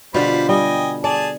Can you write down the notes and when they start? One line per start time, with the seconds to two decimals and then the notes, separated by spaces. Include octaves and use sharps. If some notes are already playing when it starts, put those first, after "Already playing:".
0.14 B2 D3 G3 F4 B4 C5
0.49 G3 D#5 G5 G#5
1.04 G#4 D5 A5